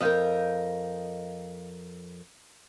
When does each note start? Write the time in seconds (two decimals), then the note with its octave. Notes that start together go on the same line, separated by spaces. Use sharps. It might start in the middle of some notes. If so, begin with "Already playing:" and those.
0.01 F2 A#4 D#5 F5 G5